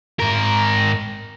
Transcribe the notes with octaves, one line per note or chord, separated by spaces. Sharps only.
G#2 A#4